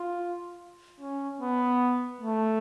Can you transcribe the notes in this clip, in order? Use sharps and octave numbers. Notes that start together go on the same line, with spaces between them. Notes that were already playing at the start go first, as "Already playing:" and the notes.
Already playing: F4
C#4
B3
A3